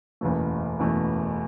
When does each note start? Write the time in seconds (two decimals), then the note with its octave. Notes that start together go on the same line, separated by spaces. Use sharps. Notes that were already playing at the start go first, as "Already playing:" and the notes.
0.21 F#1 E2 B2 A3
0.79 F#1 E2 B2 A3